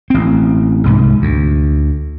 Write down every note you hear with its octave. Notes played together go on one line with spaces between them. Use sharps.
A1 C4
C2 G#2
D2